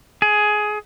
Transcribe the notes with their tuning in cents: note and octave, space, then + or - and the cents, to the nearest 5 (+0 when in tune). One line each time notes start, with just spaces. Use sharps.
G#4 +15